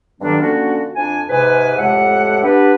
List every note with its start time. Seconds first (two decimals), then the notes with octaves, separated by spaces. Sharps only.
0.21 G2 D3 D#3 F#3 B3 D4
0.40 D3 F3 A#3 C#4 D4 F#4
0.95 F2 D4 G#5
1.29 G#2 C3 B4 G#5
1.77 F2 A2 G#3 G4 E5 F#5
2.42 B3 D4 G4 B4